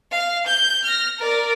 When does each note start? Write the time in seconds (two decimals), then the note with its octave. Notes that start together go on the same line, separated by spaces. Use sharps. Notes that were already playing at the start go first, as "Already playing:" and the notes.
0.11 F5
0.46 G6
0.84 F6 A#6
1.19 A#4 D5